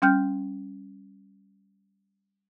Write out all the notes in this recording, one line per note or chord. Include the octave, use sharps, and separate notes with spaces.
G3 C#4 G5 F6 G6